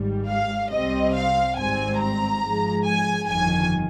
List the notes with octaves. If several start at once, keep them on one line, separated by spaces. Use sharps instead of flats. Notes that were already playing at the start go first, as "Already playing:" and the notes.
Already playing: G#1 G#2 G3
F5
C2 C3 G3 C4 D#5
F5
G#1 G#2 G3 C4 G#5
A#5
G#2 F3 G#3
G#5
G1 F2 D#3 G#5